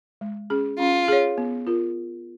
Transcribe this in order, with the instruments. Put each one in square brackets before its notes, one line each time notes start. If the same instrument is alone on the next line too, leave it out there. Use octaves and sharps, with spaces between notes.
[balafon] G#3
C#4 G#4
[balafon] C#4 [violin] F4
[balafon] G#4 C#5
B3
F4 A#4